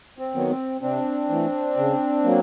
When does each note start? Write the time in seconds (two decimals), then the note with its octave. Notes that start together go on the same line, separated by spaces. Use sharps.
0.18 C4
0.34 D#3 F#3 B3
0.49 C4
0.81 C3 C4 D4
1.29 E3 A3
1.77 C#3
2.23 F#3 A#3